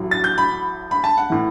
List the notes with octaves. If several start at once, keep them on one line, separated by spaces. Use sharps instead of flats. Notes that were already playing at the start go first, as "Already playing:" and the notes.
Already playing: A1 A2 F#3
A6
G6
B5
B5
A5
F#5
A2 E3